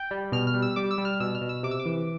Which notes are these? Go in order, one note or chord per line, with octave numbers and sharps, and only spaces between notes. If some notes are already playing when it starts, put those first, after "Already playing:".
Already playing: G5
G3
B2 F6
F6
G3
E6
G3 D6
E6
G3
F6
B2 E6
F6
B2
E6
C3 D6
E6
D6
E3